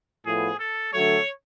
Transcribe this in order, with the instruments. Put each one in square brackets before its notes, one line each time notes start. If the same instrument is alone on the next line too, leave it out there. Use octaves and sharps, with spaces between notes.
[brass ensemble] A2 F3 B3 [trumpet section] G#4
[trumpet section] A4
[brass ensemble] D3 F#3 A3 [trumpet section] C#5